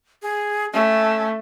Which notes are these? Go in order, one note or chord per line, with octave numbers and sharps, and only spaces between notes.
G#4
A3 C#4